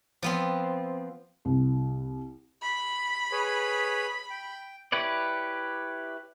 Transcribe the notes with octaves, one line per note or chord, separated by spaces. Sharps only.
F3 B3 C4
C2
B5
G#4 B4 C#5
G5
E4 G4 B4 C#5 D5